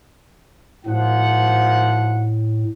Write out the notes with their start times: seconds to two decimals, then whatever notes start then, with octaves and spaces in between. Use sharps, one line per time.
0.86 G#1 A2 F3 F#5